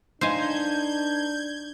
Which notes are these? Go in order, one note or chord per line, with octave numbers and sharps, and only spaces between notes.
D4 D#4 B4 C5 F5 G#5 G6 G#6